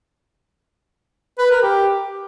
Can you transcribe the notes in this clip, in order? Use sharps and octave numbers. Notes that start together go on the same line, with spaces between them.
B4
A#4
G4